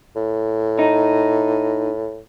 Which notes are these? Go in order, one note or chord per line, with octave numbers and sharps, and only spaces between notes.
A2
D#4